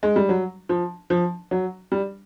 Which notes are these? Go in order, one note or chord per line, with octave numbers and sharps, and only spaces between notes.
G#3
G3
F#3
F3
F3
F#3
G3